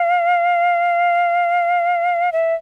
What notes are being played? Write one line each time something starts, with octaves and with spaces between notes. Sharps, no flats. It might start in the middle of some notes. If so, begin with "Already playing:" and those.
Already playing: F5
E5